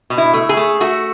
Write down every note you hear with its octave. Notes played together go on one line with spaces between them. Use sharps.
B2
E4
A3
G#4
A3
A3 F#4